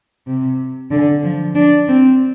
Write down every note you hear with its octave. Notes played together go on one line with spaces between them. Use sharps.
C3
D3
F3
D4
C4